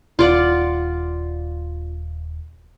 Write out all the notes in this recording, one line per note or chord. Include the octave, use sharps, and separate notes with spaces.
D#1 F4 D5 F#5